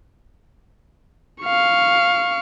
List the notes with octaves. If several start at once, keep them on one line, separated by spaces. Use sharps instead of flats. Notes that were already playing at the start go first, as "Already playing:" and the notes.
F5 C#6